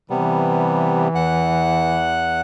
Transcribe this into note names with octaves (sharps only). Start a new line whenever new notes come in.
C3 E3 G3 B3
E2 F#5 F#6